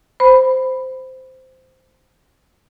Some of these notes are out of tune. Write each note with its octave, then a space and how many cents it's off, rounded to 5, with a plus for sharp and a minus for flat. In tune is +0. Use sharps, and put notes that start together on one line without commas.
C5 -10 B5 +0